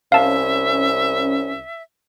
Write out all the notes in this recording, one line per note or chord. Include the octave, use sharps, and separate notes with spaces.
C2 C#4 E5 F5 A5